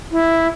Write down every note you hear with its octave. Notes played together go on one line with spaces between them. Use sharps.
E4